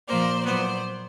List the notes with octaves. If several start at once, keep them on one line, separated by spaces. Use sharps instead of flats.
A#2 F3 A#3 C5 D5
A#2 F#3 B3 C5 D5